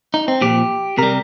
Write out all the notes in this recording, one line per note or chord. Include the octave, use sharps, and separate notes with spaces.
D#4
C4
A#2 F3 G4
C3 G3 A#4